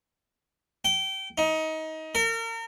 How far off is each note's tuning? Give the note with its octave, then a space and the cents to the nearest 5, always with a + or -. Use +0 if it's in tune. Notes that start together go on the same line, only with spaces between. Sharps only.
G5 -25
D#4 +25
A#4 -35